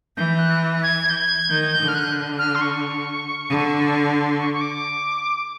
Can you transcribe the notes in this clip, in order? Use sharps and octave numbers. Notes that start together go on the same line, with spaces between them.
E3 G6
F#6
G#6
G6
G#6
D#3 G6
G6
D3
F6
F#6
F6
C6
C#6
D3
C6
C#6
C#6
D6